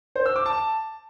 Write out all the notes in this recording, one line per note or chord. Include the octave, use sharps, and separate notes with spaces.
C5
E6
D6
A5